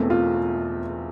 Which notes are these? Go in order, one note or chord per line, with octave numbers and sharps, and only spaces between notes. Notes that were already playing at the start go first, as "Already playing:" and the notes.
Already playing: E1 E2 B2 A3 C4
F4